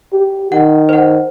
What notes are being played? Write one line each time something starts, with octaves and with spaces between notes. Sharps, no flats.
G4
D#3 F#5
C5 F#5